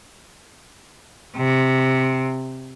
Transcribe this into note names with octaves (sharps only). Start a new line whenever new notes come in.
C3